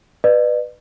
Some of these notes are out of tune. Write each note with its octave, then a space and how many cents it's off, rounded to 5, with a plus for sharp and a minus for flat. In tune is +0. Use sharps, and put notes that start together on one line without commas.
B4 +0 D5 +45